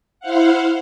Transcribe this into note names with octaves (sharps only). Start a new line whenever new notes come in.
E4 C5 F5 F#5